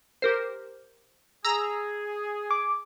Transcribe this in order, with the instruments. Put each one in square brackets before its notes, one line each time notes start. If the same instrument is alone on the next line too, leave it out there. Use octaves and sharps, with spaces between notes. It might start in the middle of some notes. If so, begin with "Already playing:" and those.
[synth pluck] G4 A#4 C5
[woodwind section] G#4 [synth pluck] A#5 E6 A#6
[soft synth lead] D6